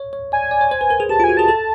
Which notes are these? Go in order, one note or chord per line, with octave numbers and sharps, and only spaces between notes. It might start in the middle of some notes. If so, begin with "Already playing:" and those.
Already playing: C#5
C#5
D5 G#5
D5
C#5
C5
B4
A#4
G#4
G4 A5
F4 G#5
F#4
G#4 A5
A4